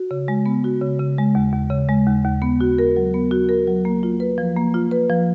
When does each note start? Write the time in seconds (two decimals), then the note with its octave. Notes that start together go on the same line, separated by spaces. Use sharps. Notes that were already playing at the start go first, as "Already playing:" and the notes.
Already playing: F#4
0.11 C#3
0.28 G#3
0.46 B3
0.64 F#4
0.81 C#3
0.99 C#3
1.18 G#3
1.35 D#2
1.53 D#2
1.70 C#3
1.89 G#3
2.06 D#2
2.25 D#2
2.42 B3
2.61 F#4
2.78 A#4
2.96 F#3
3.14 B3
3.31 F#4
3.49 A#4
3.68 F#3
3.85 A#3
4.03 F4
4.20 B4
4.38 F3
4.56 A#3
4.74 F4
4.91 B4
5.09 F3